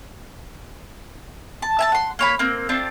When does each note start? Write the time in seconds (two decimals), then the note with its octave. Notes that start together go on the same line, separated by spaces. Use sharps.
1.62 A5
1.79 E5 G#5 A5
1.92 F#5 C6
2.19 A#3 C#5 B5
2.39 A#3 C4
2.69 C4 D4 F4